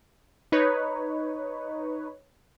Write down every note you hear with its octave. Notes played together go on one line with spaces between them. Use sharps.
D#4 B4 C#5